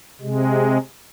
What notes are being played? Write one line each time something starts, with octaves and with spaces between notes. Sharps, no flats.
C3 G#3